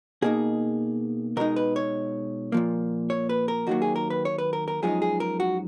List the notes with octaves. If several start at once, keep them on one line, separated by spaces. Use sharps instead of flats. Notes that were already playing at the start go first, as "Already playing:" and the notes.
B2 A#3 D#4 G#4
B2 G#3 D#4 A#4
B4
C#5
A#2 F3 A#3
C#5
B4
A#4
D#2 D#3 F#3 A#3 F#4
G#4
A#4
B4
C#5
B4
A#4
A#4
F#2 F3 G#3 D#4 G#4
G#4
A#4
F#4